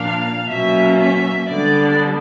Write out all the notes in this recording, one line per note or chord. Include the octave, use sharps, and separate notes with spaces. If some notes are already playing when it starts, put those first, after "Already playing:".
Already playing: A#2 F3 A#3 D4 F5
B2 F#3 A#3 C#4 E5
E5
D3 G3 B3 D4 D5